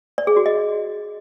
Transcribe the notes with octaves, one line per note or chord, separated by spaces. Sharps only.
D5
G#4
F#4
D#5